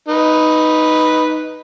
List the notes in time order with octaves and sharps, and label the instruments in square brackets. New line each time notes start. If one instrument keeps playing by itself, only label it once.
[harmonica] D#4 B4